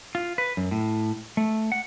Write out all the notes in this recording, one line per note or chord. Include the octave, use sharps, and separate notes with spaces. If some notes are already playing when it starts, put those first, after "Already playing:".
F4
B4
F#2
A2
A3
F#5